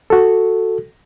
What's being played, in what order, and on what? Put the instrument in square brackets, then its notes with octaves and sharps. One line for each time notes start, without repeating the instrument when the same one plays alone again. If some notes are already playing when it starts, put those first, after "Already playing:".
[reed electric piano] F#4 A4